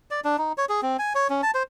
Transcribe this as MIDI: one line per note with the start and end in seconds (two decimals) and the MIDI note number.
0.11 0.21 74
0.24 0.37 62
0.38 0.52 63
0.58 0.65 73
0.69 0.81 68
0.82 0.97 60
0.99 1.13 80
1.15 1.28 73
1.30 1.41 61
1.43 1.51 81
1.54 1.63 72